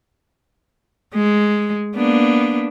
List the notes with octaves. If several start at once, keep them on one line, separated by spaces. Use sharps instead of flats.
G#3
A#3 B3 D4